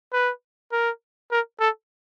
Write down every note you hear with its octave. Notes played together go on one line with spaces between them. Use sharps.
B4
A#4
A#4
A4